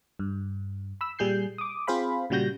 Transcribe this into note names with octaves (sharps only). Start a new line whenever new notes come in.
G2
B5 E6
A#2 G3 G#4 G6 C7
D6 D#6
C4 F4 G#4 C5 F5 B5
A#2 C#3 G3 F#4 G6 A#6